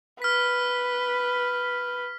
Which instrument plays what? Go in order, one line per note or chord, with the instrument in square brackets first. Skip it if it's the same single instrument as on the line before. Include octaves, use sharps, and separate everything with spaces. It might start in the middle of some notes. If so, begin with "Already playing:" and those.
[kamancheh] B4 [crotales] F6 B6